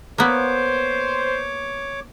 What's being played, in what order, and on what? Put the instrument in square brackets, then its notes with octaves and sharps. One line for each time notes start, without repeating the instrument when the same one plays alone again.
[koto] A#3 B3 [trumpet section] C5 [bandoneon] C#5 D6